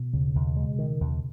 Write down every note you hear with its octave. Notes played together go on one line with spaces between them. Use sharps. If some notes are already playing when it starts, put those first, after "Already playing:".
Already playing: B2
D#2 C#3
D#2
G#3
D#3
D#2